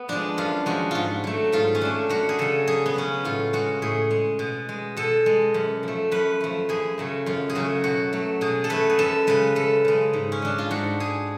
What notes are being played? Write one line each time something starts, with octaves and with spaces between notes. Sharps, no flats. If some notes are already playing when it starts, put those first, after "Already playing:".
Already playing: B3
F3 G#3 D4
F#2 F4
F3 G#3 F#4
G#2 F4 F#4
F#3 A3
G#2 F4
C#4
F#3 A3 D4
F#2 F#4
G#4
C#3 F#3 A4
F#2 G#4
B3
C#3 F#3 C#4
A2 F4
G#3 F#4
A2 G#4
G#3
B2
G#3
B2 A4
G#3
F#2
F3 A3
F#2 B4
F3 A3
F#2 G#4
C#3 F#3 A3
F#2 F4
G#4
C#3 F#3 A3 F#4
B2 F#4
F#3 A3
B2 G#4
A4
F#3 A3 B4
G#4
F#2 A4
C#3 G#3 B4
F#2 A4
C#3 G#3
G#2
C#4
G#3 D4
F4
G#2 F#4
G#3 G#4